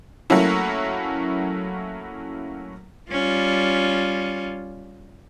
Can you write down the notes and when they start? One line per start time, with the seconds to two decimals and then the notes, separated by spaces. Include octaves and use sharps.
0.30 F#3 A3 A#3 C#4 E4
3.11 G3 C#4 F4